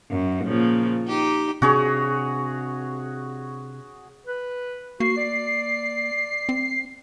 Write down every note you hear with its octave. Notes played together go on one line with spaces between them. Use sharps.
F#2
A#2 C#3 F3
D#4 G4
C3 C4 D4 F#4 G#4 C#5
B4
A#3 F#4 C7
D5
C4